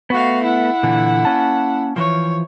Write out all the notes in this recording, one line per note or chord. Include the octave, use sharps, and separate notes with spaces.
A3 B3 F#4 F5
E4 F#5
A#2 D3 E3
A#3 C#4 A5
E3 F3 C#5